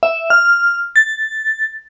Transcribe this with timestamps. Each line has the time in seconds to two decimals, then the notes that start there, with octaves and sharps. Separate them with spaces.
0.03 E5
0.30 F6
0.96 A6